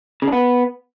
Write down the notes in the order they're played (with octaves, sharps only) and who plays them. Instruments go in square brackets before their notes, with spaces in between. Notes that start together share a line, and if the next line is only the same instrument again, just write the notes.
[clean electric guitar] C#3
D4
B3